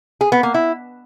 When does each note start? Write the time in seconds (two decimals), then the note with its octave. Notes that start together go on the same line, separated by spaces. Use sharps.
0.21 G#4
0.32 B3
0.43 A#3
0.54 E4